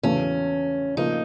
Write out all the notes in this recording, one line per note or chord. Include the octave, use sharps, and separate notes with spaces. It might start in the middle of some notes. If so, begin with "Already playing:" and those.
E2 C#3 F#3 A3 C#4
C#3 F3 A#3 D#4